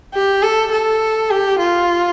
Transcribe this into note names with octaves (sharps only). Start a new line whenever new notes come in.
G4
A4
A4
G4
F4